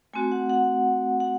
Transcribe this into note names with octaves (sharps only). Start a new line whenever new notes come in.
A3 C4 F#4 G#5
F#5
F#5
F#5